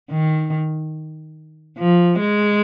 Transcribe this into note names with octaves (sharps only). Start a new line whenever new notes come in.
D#3
F3
G#3